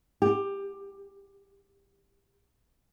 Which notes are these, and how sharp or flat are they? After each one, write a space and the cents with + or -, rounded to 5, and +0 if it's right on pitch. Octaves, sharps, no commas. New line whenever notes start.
G4 +15